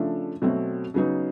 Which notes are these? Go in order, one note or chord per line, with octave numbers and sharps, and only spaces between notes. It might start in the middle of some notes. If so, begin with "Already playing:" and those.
Already playing: C#3 F3 A3 D4
B2 F#3 A3 C4
C#3 F#3 B3 D#4